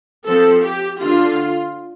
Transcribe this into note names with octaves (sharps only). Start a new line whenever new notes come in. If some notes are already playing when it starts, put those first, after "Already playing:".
F3 C4 A4
G4
D3 A3 D4 F4